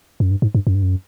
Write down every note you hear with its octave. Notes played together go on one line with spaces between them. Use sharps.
F#2
G2
G#2
G2
F#2
G2
F#2